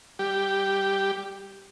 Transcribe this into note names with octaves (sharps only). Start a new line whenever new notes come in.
G3 G4